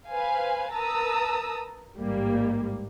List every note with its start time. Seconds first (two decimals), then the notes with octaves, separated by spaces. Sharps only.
0.10 B4 C5 F5 G#5
0.73 A#4 B4 A5 A#5 D#6 E6
1.99 A1 G#2 G3 A#3